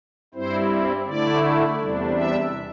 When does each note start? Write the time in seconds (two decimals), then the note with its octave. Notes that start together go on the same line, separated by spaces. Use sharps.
0.34 G2 G3 C4 E4 C5
1.06 D3 A3 E4 D5
1.79 E2 C3 G3 D4
2.15 E5